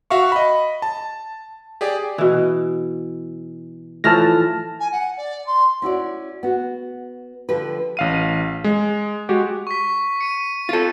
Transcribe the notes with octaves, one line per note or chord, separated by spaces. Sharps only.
F#4 E5 F5 C#6
D#5 B5
A5
G4 G#4 D5
B2 E3
A2 E3 F3 A5 F6 A#6
G#5
F#5
D5
C6
C#4 E4 F#4 D5
B3 F#4
D3 F3 G4 B4
A1 F5 D#7
G#3
G#3 F#4 G4
C#6 B6
C#7 D#7
F4 A4